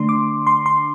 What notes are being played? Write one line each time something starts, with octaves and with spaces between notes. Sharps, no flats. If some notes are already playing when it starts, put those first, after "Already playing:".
Already playing: D3 A3 D4 C6
D6
C6
C6